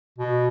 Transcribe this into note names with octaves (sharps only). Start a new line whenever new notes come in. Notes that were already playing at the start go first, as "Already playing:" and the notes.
B2